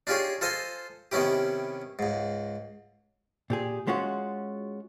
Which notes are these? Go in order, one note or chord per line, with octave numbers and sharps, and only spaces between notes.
D4 D#4 F4 G4 G#4 C#5
F4 A4 C5 D#5 G#5
C3 D#3 B3 C#4 E4 G4
C#2 G#2
A#2 G4 G#4
G#3 C#4 F4 F#4